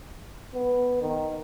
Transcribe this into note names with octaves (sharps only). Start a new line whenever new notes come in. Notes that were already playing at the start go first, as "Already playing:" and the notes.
B3
D#3